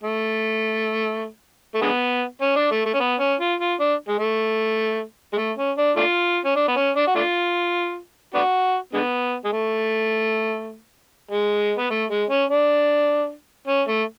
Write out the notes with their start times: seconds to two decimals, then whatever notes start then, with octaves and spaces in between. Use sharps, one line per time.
0.03 A3
1.75 A3
1.82 D3 G#3 B3
2.41 C#4
2.56 D4
2.71 A3
2.86 A3
2.94 C#4
3.00 B3
3.20 C#4
3.39 F4
3.60 F4
3.80 D4
4.08 G#3
4.19 A3
5.33 G#3
5.38 A3
5.58 C#4
5.77 D4
5.97 A3 D4 F4
6.45 C#4
6.56 D4
6.68 B3
6.77 C#4
6.96 D4
7.07 F#4
7.15 A3 D4 F4
8.34 B3 D4 F#4
8.93 D3 G#3 B3
9.44 G#3
9.53 A3
11.31 G#3
11.78 B3
11.90 A3
12.10 G#3
12.30 C#4
12.49 D4
13.68 C#4
13.88 A3